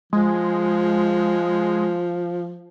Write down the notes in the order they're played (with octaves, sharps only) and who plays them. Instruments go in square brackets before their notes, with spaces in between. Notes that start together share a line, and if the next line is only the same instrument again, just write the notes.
[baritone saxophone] F3 [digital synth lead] G#3